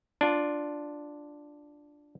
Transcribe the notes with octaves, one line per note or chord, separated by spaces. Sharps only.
D4 F4